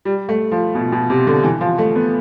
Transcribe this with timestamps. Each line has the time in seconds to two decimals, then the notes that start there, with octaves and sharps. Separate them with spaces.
0.05 G3
0.29 A3
0.52 F3
0.75 B2
0.92 B2
1.10 C3
1.27 D3
1.44 E3
1.61 F3
1.78 A3
1.95 B3